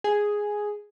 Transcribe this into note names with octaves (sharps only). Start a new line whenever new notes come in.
G#4